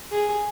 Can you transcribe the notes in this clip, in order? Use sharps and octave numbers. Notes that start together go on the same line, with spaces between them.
G#4